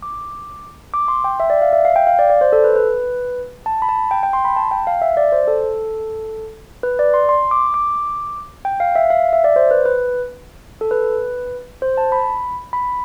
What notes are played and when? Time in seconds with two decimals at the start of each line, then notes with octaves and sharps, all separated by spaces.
0.02 D6
0.94 D6
1.08 C6
1.24 G5
1.40 E5
1.50 D5
1.62 F5
1.73 E5
1.85 F5
1.96 G5
2.07 F5
2.19 D5
2.30 D5
2.41 C5
2.52 A4
2.64 B4
2.76 B4
3.66 A5
3.82 B5
3.89 A5
4.11 G5
4.23 G5
4.33 C6
4.45 B5
4.56 A5
4.71 G5
4.87 F5
5.02 E5
5.17 D5
5.32 C5
5.48 A4
6.83 B4
6.99 D5
7.14 C6
7.29 C6
7.51 D6
7.74 D6
8.65 G5
8.80 F5
8.95 E5
9.10 F5
9.33 E5
9.44 D5
9.56 C5
9.71 B4
9.85 B4
10.81 A4
10.91 B4
11.82 C5
11.98 A5
12.12 B5
12.73 B5